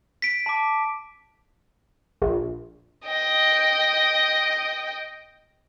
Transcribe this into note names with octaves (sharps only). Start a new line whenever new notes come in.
B6 D7
A5 D6
A#1
D#5 G5